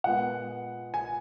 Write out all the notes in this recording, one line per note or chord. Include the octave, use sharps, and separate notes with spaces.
A#2 G#3 B3 F#5
G#5